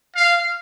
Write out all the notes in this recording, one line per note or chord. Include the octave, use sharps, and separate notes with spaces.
F5